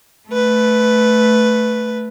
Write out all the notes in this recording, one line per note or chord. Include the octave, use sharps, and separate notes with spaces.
A3 B4